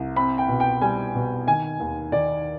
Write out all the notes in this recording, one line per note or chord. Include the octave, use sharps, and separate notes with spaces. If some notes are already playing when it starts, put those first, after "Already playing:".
Already playing: C2
C4 B5
G5
B2
G5
G3 G#5
B2
D#3 G#5
D#2
D#3 D5